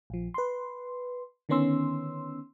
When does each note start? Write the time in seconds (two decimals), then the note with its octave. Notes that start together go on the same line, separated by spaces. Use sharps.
0.10 A#1 F3
0.34 B4 C6
1.49 D3 D#3 B3 C#4 C6 E6